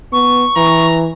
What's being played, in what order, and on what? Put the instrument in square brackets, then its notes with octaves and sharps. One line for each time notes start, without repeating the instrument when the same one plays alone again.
[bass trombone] B3 [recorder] C#6
[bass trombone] E3 [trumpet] A#5